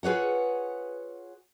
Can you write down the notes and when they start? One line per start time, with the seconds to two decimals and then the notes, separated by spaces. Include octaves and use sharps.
0.03 F4 G#4 B4 C#5 F#5